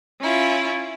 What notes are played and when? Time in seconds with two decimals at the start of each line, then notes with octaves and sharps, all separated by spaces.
0.20 C#4 E4 F4